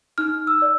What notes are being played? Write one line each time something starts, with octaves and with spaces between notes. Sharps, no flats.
D#4 F6
E6
D5